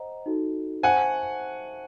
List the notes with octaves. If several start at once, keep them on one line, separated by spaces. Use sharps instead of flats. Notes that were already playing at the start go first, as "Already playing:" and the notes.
Already playing: C5 D#5 F#5 A#5
D#4 F#4 A4
C5 E5 F#5 G#5 A5 C#6